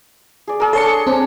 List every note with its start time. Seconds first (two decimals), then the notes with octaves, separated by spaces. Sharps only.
0.47 G#4 D5
0.60 G#4 A#4
0.73 D4 A4 C#5 C6 C#7
1.07 C4 D4